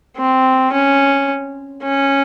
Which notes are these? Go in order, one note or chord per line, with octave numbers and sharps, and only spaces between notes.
C4
C#4
C#4